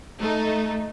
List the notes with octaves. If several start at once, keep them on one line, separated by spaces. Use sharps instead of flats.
A3 D#4